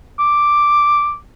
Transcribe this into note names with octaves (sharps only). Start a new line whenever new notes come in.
D6